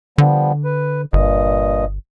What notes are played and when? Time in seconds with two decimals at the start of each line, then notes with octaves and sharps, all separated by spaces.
0.18 D3 F3 G3 B3
0.64 B4
1.13 G1 G2 A#2 D#5